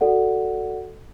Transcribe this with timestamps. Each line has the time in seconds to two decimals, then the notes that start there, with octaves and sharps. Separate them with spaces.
0.01 F#4 A4 D5 F#5